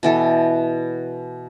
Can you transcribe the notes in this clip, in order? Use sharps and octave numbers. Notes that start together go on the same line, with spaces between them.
B2 E3 A4